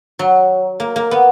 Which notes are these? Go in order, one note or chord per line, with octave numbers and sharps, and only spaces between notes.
F#3
A#3
A#3
B3